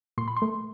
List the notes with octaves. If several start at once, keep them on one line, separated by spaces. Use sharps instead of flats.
A#2 C6
B5
C6
A3